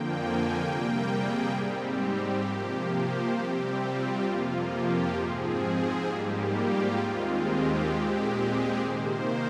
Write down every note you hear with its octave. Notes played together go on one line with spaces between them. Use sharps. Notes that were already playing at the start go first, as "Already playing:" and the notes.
Already playing: F2 D3 F3 A#3 G5
G#5
C3 G3 A#3 G5
G#4
G#2 G3 C4 G4
G4
C3 F3 A#3
C5
C3 G3 C4 G4
F4
F2 C3 F3 A#3
G4
G#2 F3 C4 G#4
G#4
G#2 G3 A#3 G4
F4
D#2 D#3 G#3 C4
G4
A#2 G#3 C4 G4
G#4
C3 D#3 A#3 C5